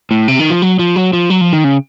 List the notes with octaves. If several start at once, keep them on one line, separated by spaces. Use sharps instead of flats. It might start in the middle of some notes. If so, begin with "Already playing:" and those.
A2
C3
D#3
F3
F#3
F3
F#3
F3
F#3
F3
D#3
C#3